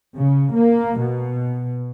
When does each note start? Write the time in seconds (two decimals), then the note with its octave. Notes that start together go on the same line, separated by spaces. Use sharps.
0.16 C#3
0.54 A#3
0.99 B2